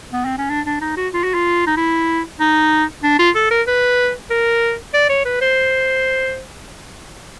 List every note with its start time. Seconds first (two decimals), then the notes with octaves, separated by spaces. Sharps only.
0.13 B3
0.25 C4
0.38 C#4
0.50 D4
0.66 D4
0.81 D#4
0.97 F#4
1.13 F4
1.24 F#4
1.34 F4
1.66 D#4
1.77 E4
2.40 D#4
3.03 D4
3.19 F4
3.35 A4
3.51 A#4
3.67 B4
4.30 A#4
4.94 D5
5.09 C#5
5.25 B4
5.41 C5